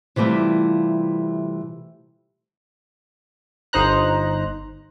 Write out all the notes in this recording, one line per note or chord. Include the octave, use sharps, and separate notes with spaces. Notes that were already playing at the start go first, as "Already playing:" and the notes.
C3 E3 G3 A3 F4
G1 D#4 C5 A#5 F#6